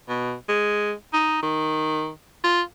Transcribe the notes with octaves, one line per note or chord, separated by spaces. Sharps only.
B2
G#3
D#4
D#3
F4